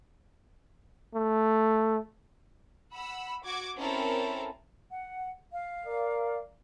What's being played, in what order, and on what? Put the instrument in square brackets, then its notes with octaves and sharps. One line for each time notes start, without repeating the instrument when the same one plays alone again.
[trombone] A3
[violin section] F#5 B5 E6
F#4 D6 G#6
C4 C#4 E4 A4 A#4
[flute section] F#5
F5
[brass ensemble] A#4 D5